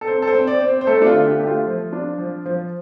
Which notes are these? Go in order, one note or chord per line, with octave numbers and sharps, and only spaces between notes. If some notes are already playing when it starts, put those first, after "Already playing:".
A4
C4 C5
A4
C5
C4
D5
C4
C5
C5
A3 A4
D4
F4
D3
G4
A3 G4
F4
F3
D4
F3
F3